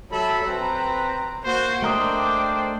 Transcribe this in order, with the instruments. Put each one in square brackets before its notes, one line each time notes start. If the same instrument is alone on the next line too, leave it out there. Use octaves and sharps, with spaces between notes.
[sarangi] F#3 [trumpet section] A4 E5 B5
[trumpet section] C4 B4 [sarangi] A#5
[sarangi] A#3 [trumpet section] F#4 C5
[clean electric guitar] A3 A#4 D#5 [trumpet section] D4 C5 D5 [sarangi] G5